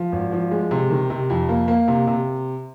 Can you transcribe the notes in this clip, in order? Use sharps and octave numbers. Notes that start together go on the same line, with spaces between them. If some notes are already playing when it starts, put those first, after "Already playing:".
Already playing: F3
G#1
F3
G#3
C3
D#3
C3
F2
A#3
A#3
C3
C3